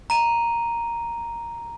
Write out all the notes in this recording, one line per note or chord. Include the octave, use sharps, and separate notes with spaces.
A#5 D#7